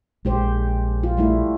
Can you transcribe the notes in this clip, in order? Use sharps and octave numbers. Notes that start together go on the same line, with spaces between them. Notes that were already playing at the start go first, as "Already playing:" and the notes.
A#1 G#3 G4 C5
F4
G3 A3 E4